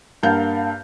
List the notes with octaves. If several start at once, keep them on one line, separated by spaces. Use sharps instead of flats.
G2 A#3 F5 F#5 A5 G6